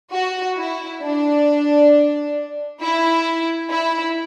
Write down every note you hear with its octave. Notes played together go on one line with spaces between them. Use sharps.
F#4
E4
D4
E4
E4